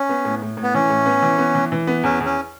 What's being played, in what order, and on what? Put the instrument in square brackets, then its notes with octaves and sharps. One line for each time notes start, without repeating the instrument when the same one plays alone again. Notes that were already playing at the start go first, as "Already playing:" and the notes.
Already playing: [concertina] C#4
[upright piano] B3
A2
A2
A2
[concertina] B3
[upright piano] E3 [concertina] C#4
[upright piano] A2
B3
E3
B3
E3
E3
B3
[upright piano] E2 [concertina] C#4
[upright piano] E2
[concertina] C#4